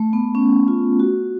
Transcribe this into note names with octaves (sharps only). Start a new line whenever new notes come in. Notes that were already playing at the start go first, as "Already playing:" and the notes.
Already playing: A3
B3
C#4
F4
F#4